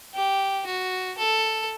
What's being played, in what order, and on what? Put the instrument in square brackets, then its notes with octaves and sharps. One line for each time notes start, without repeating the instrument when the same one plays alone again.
[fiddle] G4
F#4
A4